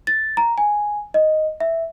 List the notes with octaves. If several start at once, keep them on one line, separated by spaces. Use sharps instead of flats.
A6
A#5
G#5
D#5
E5